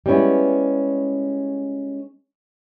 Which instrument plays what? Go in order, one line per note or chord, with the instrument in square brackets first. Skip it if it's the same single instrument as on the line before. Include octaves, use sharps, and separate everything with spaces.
[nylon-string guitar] G3 G#3 B3 C#4 E4